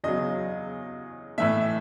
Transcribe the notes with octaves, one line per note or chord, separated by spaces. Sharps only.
E2 C#3 F#3 D#5
A2 E3 A3 E5